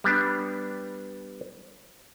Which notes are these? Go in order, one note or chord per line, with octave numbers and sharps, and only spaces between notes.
G3 B3 D4